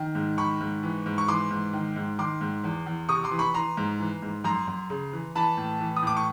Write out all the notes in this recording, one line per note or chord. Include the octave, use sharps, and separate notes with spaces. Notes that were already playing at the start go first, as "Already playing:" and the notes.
Already playing: D#3
G#2
D#3 B5 C#6
G#2
E3
G#2
C#6
E3 C6 D6
G#2
D#3
G#2
D#3 C6 D6
G#2
E2
E2
C3 C#6 D#6
C6 D6
E3
B5 C#6
E3 A#5 C6
G#2
E3
G#2
F#2 A#5 C6
F#2
C#3
E3
E3 A5 B5
A2
E3
D#6
A2 D6
C#6